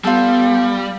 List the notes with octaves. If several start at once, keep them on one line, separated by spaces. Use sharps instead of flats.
G3 B3 F4 A4